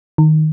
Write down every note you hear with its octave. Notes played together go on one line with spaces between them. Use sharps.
D#3